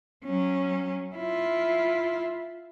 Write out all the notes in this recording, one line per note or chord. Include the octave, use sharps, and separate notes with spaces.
F#3 C#4
E4 F4